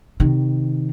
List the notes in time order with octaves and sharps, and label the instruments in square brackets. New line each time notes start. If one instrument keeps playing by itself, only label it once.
[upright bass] C3 D#3